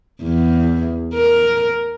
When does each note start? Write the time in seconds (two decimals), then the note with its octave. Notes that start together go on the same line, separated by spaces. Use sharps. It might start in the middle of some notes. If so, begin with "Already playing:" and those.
0.23 E2
1.14 A#4